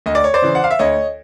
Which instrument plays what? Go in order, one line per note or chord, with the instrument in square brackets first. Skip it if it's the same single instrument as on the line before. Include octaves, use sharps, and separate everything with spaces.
[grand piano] D2 D#5
D5
C#5
C5 D5
C#3 E3
F#5
F5
E5
D2 C#5 D#5